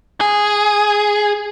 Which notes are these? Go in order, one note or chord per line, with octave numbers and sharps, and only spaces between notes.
G#4